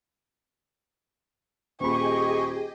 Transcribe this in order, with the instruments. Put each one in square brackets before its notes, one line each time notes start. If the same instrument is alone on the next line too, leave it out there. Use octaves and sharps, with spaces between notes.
[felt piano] D#1 B5 [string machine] G4 G#4 D#5 [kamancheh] C#6